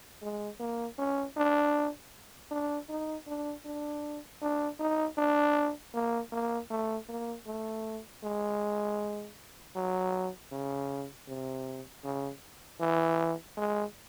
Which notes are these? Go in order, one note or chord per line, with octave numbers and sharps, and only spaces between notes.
G#3
A#3
C#4
D4
D4
D#4
D4
D4
D4
D#4
D4
A#3
A#3
A3
A#3
A3
G#3
F#3
C#3
C3
C#3
E3
G#3